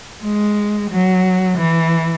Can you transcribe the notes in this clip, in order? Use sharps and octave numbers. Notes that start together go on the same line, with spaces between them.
G#3
F#3
E3